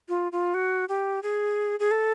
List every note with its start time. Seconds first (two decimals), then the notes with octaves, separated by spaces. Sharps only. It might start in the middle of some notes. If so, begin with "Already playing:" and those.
0.09 F4
0.32 F4
0.54 F#4
0.89 G4
1.23 G#4
1.80 G#4
1.91 A4